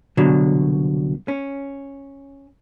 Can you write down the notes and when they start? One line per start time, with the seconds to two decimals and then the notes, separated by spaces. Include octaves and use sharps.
0.17 C2 B2 D3 F#3
1.28 C#4